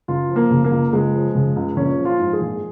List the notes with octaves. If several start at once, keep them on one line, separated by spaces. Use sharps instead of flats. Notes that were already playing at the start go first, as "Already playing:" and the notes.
C#2 F4
F3
A#3
C#3
A#3
C#2
C#2 G#3
F3
C#3
C#2
A#1 C#4
F3
F4
G#2
G#4
A#1